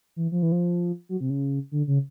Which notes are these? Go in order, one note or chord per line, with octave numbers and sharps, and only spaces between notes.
E3
F3
E3
F3
F#3
C3
C#3
D3
C#3